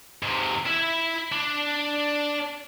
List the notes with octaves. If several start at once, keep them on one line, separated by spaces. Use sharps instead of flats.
G#2 C3
E4 E5
D4